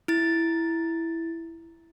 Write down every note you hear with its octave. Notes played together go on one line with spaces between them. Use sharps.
E4 A6